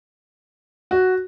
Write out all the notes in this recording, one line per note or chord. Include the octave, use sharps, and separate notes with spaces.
F#4